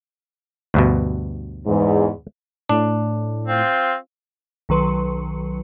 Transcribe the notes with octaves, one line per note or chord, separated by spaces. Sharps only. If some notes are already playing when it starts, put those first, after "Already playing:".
D2 G2 B2
E2 G#2
A2 D4
C4 F4
B1 D#3 F#3 B4 C6 C#7